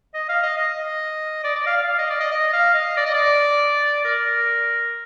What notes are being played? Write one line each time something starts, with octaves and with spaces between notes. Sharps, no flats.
D#5
F5
D#5
D#5
D5
D5
F5
F5
F5
D#5
D5
D#5
D#5
F5
D#5
D5
D#5
D5
A#4